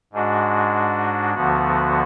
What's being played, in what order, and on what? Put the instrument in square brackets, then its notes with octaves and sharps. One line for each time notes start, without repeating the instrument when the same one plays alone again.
[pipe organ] G#2 G#3 D4 F#4
D2 D3 F3 B3 F#4